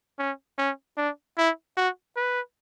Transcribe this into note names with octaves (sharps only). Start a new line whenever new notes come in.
C#4
C#4
D4
E4
F#4
B4